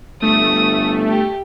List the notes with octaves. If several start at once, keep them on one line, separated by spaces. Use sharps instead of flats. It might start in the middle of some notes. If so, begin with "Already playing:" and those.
G1 A3 D#6
G4